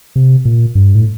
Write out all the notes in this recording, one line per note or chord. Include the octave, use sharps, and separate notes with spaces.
C3
A#2
G2
A2